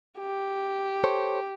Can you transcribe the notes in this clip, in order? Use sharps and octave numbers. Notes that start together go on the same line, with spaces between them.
G4
A4 C5 C#5